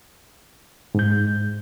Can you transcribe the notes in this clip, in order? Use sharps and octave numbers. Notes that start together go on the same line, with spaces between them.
G#2 G6